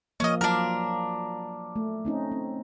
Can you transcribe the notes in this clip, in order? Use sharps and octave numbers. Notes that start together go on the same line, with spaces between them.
F3 A#3 C#4 D#5
F#3 D4 F4 A#4 F5
A3
C4 C#4 D#4
C4